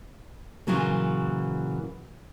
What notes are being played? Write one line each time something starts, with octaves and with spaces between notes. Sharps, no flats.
A#2 C#3 E3 F#3 A#3